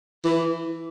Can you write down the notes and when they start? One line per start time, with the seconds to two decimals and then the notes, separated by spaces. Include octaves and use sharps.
0.25 E3